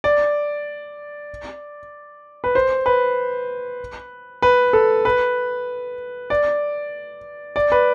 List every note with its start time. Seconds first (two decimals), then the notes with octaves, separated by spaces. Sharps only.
0.04 D5
2.44 B4
2.55 C5
2.86 B4
4.42 B4
4.73 A4
5.05 B4
6.30 D5
7.56 D5
7.72 B4